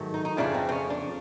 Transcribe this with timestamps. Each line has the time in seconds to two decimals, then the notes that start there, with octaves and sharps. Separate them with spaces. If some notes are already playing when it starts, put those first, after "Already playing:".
Already playing: G#2 D#3 F#3 A3
0.14 D#4
0.25 D#4
0.37 F2 C#3 F3 A3 D4
0.54 C4
0.69 C4
0.72 C#4
0.90 D4